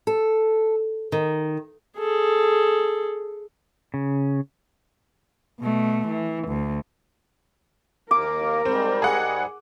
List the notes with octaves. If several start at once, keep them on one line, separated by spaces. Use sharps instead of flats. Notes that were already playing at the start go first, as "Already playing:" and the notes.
A4
D#3
G#4 A4
C#3
B2 A3
E3
D2
D#2 A#3 A#4 D6
G#2 G3 C4
G#4 F#5